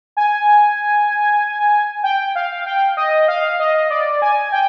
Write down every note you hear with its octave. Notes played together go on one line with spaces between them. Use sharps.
G#5
G5
F5
G5
D#5
F5
D#5
D5
G#5
G5